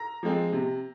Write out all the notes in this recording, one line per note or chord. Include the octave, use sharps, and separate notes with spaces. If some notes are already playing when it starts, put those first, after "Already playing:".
Already playing: A#5 A#6
F3 G#3 C4
C3